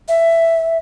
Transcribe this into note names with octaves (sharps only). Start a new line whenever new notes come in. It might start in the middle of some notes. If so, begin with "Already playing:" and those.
E5